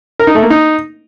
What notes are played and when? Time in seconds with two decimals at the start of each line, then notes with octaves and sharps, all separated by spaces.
0.20 A#4
0.27 D#4
0.35 A3
0.43 A#3
0.50 D#4